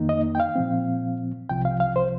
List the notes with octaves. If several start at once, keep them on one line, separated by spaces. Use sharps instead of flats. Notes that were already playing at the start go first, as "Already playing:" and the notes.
Already playing: F2 D#3 A#3 D#4
D#5
G5
F5
A#2 F3 C4
C2 C3 F3 G5
F5
F5
C5